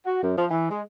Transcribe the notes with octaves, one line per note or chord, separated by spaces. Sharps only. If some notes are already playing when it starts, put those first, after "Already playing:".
F#4
F#2
F3
E3
G#3